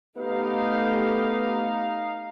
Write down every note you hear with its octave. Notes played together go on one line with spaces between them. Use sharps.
A3 B3 D#4 G4 F5